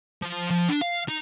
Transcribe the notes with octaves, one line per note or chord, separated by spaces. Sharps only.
F3
F3
D4
F5
D#4